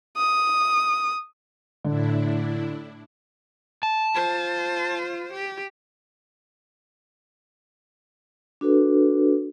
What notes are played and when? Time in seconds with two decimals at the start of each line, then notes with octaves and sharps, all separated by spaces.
0.17 D#6
1.85 A2 D3 D4 E4
3.83 A5
4.15 F4 C5
5.33 G4
8.61 D4 F#4 A4 B4